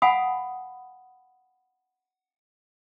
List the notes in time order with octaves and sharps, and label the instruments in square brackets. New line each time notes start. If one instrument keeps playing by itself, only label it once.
[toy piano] F5 F#5 G#5 B5 D#6